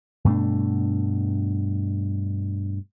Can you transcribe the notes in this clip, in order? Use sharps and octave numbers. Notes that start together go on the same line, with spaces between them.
G2 B2 A3 D4